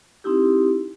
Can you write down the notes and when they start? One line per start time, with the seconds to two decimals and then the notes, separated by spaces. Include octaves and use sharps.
0.24 C4 D#4 E4 G4